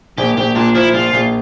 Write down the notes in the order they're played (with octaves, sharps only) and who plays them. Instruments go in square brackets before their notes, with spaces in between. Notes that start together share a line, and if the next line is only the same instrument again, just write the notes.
[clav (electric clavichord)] A#1 [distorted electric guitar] G4
[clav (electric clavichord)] A#1 [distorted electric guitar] G4
[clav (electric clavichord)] A#2 [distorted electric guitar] D4
[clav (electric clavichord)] F3 [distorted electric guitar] E4
[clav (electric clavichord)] A#1 [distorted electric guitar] F4
[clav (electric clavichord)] A#1